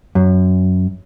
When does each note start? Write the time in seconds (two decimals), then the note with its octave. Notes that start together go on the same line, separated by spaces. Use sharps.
0.15 F#2